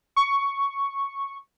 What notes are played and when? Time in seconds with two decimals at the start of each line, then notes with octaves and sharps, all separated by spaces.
0.16 C#6